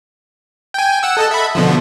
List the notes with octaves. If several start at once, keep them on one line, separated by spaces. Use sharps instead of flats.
G5 G#5
F#5 E6
A4 D#5 A5
E5 B5
B2 D3 F3